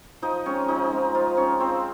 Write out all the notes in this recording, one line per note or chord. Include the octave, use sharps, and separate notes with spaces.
F3 D#4 D#5
G#3 C4 C#4 C#5
F3 D#4 D#5
G#3 C4
F3 F4 F5
C4 C#4 D#4 C#5
F3 C4 C5